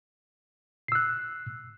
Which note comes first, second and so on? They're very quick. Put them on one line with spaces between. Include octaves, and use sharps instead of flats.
C7 E6 F#6